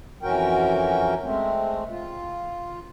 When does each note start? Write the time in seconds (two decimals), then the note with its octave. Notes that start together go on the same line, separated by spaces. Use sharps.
0.23 F2 E3 C#4 F#4 A#4 G5
1.24 G#3 A3 C4
1.90 F4